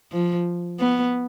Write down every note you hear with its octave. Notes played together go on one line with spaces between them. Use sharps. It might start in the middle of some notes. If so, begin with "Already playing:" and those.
F3
B3